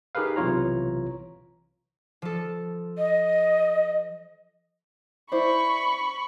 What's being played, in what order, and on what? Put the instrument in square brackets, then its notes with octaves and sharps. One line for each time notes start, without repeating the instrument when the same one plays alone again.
[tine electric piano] D#4 G4 G#4 A#4 B4 F5
B1 C3 E3 F4 C#5 A#5
[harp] F3 A4
[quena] D#5
[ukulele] E4 C5 D5 [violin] B5 C#6